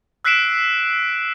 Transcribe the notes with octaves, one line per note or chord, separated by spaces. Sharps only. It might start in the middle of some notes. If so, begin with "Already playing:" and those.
E6 F#6 B6 C7 D7 E7